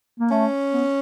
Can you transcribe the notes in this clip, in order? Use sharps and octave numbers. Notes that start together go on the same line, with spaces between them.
A#3
A3 C#4
B3